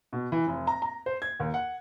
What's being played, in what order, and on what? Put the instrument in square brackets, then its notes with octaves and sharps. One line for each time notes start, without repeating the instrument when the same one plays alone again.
[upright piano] B2
E3
F1
A#5
A#5
C5
G#6
D#2
F#5